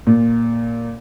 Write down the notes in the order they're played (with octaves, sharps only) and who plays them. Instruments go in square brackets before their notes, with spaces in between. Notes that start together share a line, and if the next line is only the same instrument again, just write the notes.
[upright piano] A#2